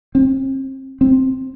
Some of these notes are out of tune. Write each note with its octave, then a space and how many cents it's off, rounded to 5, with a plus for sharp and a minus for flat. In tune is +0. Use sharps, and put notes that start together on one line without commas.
C4 +35
C4 +5